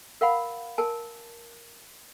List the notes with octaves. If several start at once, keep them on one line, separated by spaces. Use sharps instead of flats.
A#4 F5 F#5 B5
A#4 G#5 A5